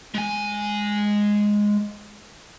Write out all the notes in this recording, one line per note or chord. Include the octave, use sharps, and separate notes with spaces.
G#3 G#5